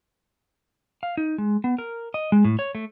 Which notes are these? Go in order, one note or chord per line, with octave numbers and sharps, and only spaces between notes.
F5
D#4
G#3
B3
A#4
D#5
G#3
A2
C#5
A3